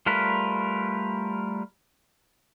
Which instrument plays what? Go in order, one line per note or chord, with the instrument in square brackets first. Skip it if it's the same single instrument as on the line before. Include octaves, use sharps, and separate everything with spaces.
[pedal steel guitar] G3 A3 F4 A#4 B4